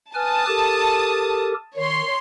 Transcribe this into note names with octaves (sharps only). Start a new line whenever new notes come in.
B4 G#5 A5 D#6 F6
G4 A4 A#4
D#3 C#5 C6